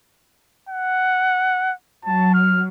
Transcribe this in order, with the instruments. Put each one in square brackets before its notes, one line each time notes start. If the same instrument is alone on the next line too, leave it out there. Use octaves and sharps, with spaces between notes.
[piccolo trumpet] F#5
[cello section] F#3 [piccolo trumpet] A5
[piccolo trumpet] F6